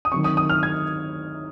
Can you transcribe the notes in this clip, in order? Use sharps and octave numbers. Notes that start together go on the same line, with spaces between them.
D#6
D#3 F#3 C4 C#6
D#6
D#6
F6
G#6